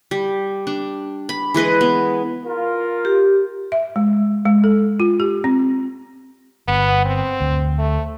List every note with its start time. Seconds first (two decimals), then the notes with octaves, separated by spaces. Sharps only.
0.11 G3
0.67 D4
1.29 B5
1.54 E3 G#3 B4 D#5
1.81 B3
2.45 F4 A#4
3.05 G4
3.72 E5
3.96 G#3
4.46 G#3
4.64 A4
5.00 F4
5.20 G4
5.44 C4
6.68 G1 B3
7.05 C4
7.41 D2
7.79 A3